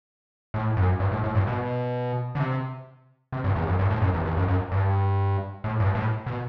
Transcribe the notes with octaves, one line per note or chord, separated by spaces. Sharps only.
A2
F#2
G2
A2
A2
G2
B2
D3
C3
C3
G2
E2
F#2
G2
A2
F#2
E2
E2
F#2
F#2
G2
A2
G2
A2
B2